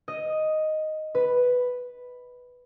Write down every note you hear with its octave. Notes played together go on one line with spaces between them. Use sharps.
D#5
B4